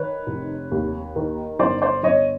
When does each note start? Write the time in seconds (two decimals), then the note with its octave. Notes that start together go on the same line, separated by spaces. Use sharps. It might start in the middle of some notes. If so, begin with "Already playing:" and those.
Already playing: D#3 B4 C#5
0.27 F1
0.71 D#2
1.16 D#3
1.59 G1 C5 D5
1.82 C5 D5
2.03 G1 C#5 D#5